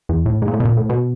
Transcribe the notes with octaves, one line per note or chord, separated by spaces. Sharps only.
E2
A2
G#2
A#2
A2
B2
A#2
A2
B2